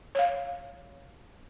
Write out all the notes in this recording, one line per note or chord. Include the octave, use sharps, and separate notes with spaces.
C#5 F5